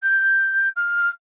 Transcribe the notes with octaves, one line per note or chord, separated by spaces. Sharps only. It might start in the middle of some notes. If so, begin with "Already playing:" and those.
G6
F6